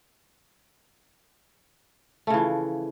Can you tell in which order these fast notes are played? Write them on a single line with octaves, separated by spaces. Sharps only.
A3 C#3 E3 F3